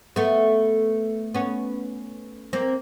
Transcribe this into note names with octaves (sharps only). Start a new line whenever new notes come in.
A3 B3
B3 C#4
A#3 C4